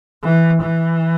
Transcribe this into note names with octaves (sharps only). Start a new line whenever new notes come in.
E3
E3